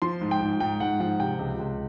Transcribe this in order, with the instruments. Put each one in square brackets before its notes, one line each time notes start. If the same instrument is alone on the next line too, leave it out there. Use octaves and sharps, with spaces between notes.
[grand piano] F3 C6
G#2
G5
G#2
G#2 G5
G#2 F#5
F3 F#5
C3 G5
C#2
C#2